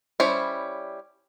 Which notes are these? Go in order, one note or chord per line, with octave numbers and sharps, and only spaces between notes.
G3 C#4 E4 C5